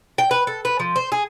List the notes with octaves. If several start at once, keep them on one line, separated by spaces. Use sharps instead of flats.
G5
B4
A4
B4
F3
C5
G#4